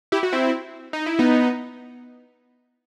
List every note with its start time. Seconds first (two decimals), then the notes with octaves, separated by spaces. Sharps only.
0.12 E4 G4
0.23 F#4
0.33 C4 E4
0.93 D#4
1.06 E4
1.19 B3 D#4